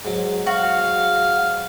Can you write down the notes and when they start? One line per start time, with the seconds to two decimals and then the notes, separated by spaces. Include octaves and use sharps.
0.05 G#2 F#3
0.46 F#4 F5